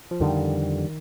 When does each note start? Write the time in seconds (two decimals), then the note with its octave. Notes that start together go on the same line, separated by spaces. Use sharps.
0.11 F3
0.20 F2 D3 D#3 G3